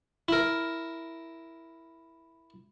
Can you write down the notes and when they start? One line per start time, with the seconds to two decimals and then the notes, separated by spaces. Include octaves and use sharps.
0.28 E4 A#4